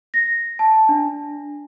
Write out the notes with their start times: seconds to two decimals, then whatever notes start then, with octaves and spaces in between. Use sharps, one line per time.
0.14 A#6
0.59 A5
0.89 D4